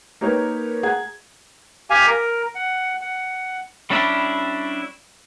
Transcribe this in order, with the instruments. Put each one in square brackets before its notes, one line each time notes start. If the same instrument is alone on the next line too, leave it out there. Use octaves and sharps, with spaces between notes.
[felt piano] A#3 D#4 G4 A#4 B4 C#5
G#4 F#5 A#5 G#6
[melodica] G4 F5 G#5
A#4
F#5
F#5
[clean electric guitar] G3 C#4 D4 E4 G4